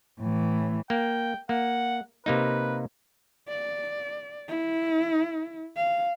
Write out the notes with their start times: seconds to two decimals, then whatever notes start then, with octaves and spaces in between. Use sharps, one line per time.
0.20 A2 E3
0.90 A#3 G5
1.49 A#3 F#5
2.26 C3 A#3 D#4 B4
3.48 D5
4.48 E4
5.77 F5